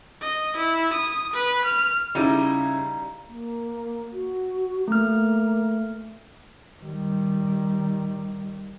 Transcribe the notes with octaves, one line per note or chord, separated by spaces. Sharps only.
D#5
E4
D#6
B4
F6
C#3 G3 D#4 E4
A#3
F#4
A3 A#3 F6
D#3 G3